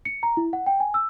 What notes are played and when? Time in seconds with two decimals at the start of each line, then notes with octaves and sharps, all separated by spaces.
0.05 C#7
0.23 A#5
0.37 E4
0.53 F#5
0.67 G5
0.80 G#5
0.94 E6